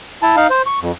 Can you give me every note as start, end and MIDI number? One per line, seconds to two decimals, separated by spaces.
0.22 0.36 64
0.22 0.36 81
0.36 0.47 63
0.36 0.47 77
0.50 0.62 72
0.66 0.79 85
0.82 0.92 41